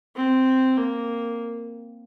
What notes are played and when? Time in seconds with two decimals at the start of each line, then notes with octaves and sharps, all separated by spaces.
0.16 C4
0.77 A#3